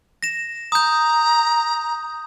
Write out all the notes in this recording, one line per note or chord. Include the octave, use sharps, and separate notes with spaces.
A#6 E7
A#5 D#6 G6